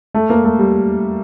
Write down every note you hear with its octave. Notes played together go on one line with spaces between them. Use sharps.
A3
A#3
A3
G3